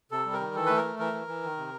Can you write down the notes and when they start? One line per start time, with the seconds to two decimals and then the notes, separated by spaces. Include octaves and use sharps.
0.11 C3 A4
0.26 G3
0.33 A#4
0.40 D#3
0.55 E3 A4
0.66 A3 B4
0.77 A#4
0.84 A3
0.99 E3 A#4
1.13 E3
1.28 E3
1.43 D#3
1.57 C3